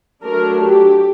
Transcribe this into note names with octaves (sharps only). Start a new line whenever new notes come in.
F#3 A3 D4 A#4
G4